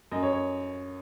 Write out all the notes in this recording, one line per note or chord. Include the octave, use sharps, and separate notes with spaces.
F#2 D#5
C#5
C#5